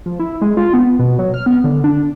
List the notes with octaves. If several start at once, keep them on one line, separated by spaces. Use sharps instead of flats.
F3
E4
G#3
F4
B3
B2
F#3
F6
B3
D3
D4